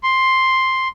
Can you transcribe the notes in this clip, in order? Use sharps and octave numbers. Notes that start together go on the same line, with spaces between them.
C6